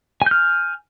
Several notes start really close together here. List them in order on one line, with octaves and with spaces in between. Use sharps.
G#5 G6 F6